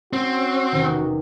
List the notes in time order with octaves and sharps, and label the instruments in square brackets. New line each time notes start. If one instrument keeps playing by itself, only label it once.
[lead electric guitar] C4 [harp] C#4 [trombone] F#4
[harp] E1 C3 D#3